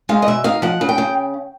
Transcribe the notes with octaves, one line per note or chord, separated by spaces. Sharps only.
G#3 F5
D#5
B2 E5
D#4 F5
F3 F#5
C#3
G5
C#3